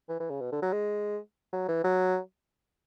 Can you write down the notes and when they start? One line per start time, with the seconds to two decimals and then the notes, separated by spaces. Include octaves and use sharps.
0.09 E3
0.20 E3
0.30 C#3
0.41 B2
0.52 D3
0.62 F#3
0.73 G#3
1.52 F#3
1.68 E3
1.84 F#3